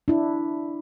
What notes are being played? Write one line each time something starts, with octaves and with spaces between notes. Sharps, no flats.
D4 E4